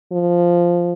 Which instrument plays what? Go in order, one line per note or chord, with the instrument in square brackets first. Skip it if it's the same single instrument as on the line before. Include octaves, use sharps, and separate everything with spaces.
[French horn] F3